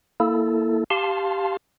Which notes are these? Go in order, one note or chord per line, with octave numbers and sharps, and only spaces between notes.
A#3 E4 A4
G4 F5 A5 C6